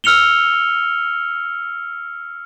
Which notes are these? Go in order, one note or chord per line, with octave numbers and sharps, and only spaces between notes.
E6 F6 C#7 F7 G7